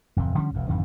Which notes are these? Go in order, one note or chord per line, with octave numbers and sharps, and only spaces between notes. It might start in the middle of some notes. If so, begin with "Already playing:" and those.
D1 F2 C3
D3 F3 G3 C#4
E1 B1 F2
G#1 F2 D3 D#3